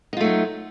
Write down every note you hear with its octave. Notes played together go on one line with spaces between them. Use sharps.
F#3 A3 D#4 F4